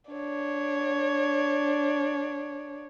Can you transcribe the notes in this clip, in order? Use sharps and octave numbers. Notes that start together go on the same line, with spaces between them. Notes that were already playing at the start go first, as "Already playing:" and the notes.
D4 C#5